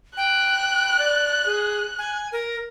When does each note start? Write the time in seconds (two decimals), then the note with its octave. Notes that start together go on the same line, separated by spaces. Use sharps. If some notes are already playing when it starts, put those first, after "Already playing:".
0.17 G5 F#6
0.99 D5
1.46 G#4
1.98 G#5
2.32 A#4